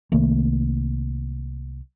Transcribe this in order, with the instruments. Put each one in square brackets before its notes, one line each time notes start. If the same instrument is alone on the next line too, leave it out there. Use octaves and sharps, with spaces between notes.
[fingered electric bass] C2 D#3 A3 A#3